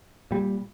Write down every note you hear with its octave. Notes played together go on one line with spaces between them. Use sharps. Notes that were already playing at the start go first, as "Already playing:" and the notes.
A#2 G3